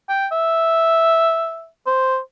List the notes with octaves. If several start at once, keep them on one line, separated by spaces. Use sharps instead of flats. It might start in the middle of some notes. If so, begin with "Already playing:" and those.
G5
E5
C5